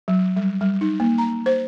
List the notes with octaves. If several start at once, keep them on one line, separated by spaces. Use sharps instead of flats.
F#3
G3
G3
D#4
A#3
A#5
C5